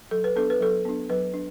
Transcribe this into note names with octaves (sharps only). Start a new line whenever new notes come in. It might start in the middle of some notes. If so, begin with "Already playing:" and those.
F#3 A4
B4
B3 D4 A4
B4
F#3 A4
B3 D4
F#3 B4
D4